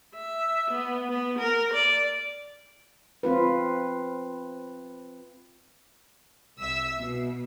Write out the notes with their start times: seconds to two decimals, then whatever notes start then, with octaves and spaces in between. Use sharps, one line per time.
0.14 E5
0.71 B3
1.09 B3
1.38 A#4
1.73 D5
3.23 C4 F4 B4
6.59 C2 E5 E6 B6
6.99 B2